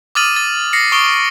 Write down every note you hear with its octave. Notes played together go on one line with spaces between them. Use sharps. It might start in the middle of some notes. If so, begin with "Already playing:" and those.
D6 D#6 F6 A6 D#7 F#7
A6
A#6 C7 C#7
C#6 D#6 D7 G7